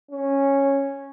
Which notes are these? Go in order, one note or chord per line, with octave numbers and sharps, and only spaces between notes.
C#4